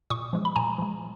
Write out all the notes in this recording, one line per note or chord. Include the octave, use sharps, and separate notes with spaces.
A#2 C#6 D#6
F3 G#3
B5
A#2 G#5 A#5
F3 G#3